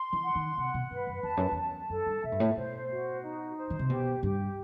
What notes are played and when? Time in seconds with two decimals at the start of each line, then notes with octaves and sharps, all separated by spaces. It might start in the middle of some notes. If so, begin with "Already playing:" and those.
Already playing: C6
0.13 E3
0.24 F#5
0.35 D#3
0.57 C3 F#5
0.74 B2
0.90 G2 B4
1.07 F#2
1.23 E2 A5
1.37 F#2
1.51 E2
1.57 A5
1.90 F#2 A4
2.06 G2
2.23 B2 E5
2.32 G2
2.40 A2
2.56 B2 C5
2.89 F#4
3.23 D#4
3.57 C5
3.70 D#3
3.79 C3
3.89 B2 G4
4.23 G2 G4